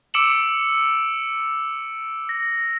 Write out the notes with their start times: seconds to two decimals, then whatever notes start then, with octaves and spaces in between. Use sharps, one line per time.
0.14 D6 E6 C#7 D7 E7 F#7
2.29 A#6